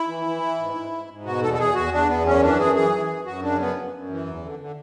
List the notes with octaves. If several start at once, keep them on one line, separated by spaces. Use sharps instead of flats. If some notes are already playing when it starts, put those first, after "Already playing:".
Already playing: E4
E3
E3
E3
G#2
G#2
G#2
G#2
B2 F#4
E2 A4
A4
E2 G#4
E2 F#4
E2 D4
E2 B3
F#2 C#4
E3 D4
F#2 G#4
E3 G#4
E3
F#2
F#2 F#4
C#3 D4
F#2 B3
F#2
F#2
E3
E2
D3
D3